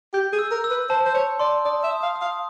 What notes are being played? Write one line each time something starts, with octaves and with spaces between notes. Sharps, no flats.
G4 G6
G#4
E6
A#4
E6
B4
C5 A5
C5
C#5 C6
D5 C6
D5 D#6
E5
D#6
F5
D#6
F5